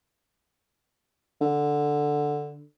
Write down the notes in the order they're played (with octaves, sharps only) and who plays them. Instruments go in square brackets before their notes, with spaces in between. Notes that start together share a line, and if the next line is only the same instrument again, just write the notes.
[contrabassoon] D3